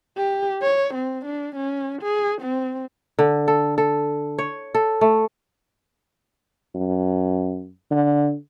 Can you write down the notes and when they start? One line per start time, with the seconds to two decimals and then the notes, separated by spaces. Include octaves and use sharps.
0.17 G4
0.62 C#5
0.95 C4
1.26 D4
1.56 C#4
2.02 G#4
2.42 C4
3.19 D3
3.48 A4
3.78 A4
4.39 C#5
4.75 A4
5.01 A3
6.75 F#2
7.91 D3